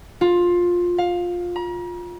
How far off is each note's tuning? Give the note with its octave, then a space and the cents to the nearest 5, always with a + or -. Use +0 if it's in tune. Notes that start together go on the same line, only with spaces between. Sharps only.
F4 +15
F5 +15
A#5 +40